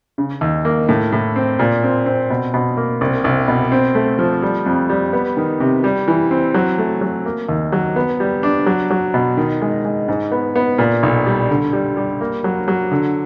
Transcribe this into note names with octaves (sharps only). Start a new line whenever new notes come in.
C#3
D#2
A#3
A2
A2
C4
A#2
C4
C4
B2
B2
A#3
C2
C2
B2
C4
A3
F3
G3
F2
G3
B3
D#3
C3
G3
E3
C4
F#3
A3
F#3
A#3
D#2
F#3
B3
G3
D4
F#3
F#3
B2
D#3
G#3
G#3
G#2
B3
B3
A#2
B1
G3
D3
G3
G3
A#3
F#3
F#3
D3